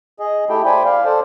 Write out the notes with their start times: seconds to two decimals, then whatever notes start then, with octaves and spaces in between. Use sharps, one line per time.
0.19 G#4 D#5
0.50 A3 E4 G4 A4 G5
0.65 C5 D5 G5 G#5 B5
0.85 D5 F5
1.05 A4 C5 D5